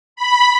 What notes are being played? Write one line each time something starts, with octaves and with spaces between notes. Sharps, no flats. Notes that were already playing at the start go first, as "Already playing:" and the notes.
B5